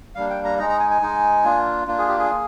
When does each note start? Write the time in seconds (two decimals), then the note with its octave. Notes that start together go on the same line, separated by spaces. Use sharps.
0.15 G3 A#3 D4 F5
0.30 G5
0.45 A#5
0.58 G#3 D#4 A#5
0.69 A#5
0.80 G#5
0.91 G#5
1.02 G#3 D#4
1.44 A#3 D4 F4
1.87 A#3 D4 F4
1.99 G#4
2.09 G4
2.19 G#4
2.30 A#3